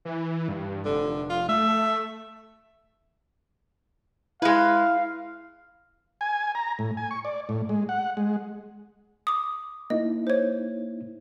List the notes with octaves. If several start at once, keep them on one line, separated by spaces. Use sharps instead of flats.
E3
G2
F1 D3
F4
A3 E5
G#3 E4 B4 F5
G#5
A#5
A2
G#5
C#6
D5
A2
G#3
F#5
G#3
D6 D#6
A#3 D#4 E4 D#5
C5 C#5